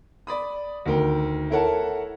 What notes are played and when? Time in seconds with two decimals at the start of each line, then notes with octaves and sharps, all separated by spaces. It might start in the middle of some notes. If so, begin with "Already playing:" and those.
0.27 D5 B5 D#6
0.86 D2 D#3 A#4 G5
1.50 E4 A4 A#4 C#5 F#5 A5